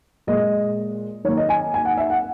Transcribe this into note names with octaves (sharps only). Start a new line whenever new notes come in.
A#2 G#3 D#5
D#3 A#3 C#5
D#5
G#5
G#5
F#5
E5
F#5